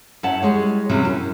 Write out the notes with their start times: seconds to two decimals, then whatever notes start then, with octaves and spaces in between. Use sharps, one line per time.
0.23 F#2 C#4 E4 F#5 A5
0.42 G3 G#3 C#5
0.89 E2 C3 F#3 G3 C#4 E5
1.05 F#2